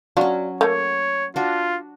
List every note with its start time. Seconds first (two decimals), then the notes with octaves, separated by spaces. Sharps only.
0.17 F#3 C#4 D4 F4 F#4
0.61 A3 A#3 C#5
1.36 D4 F4 F#4